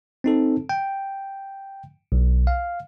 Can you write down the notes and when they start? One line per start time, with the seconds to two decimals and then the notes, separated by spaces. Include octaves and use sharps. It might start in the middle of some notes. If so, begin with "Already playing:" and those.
0.24 C4 D#4 A4
0.69 G5
2.12 B1
2.47 F5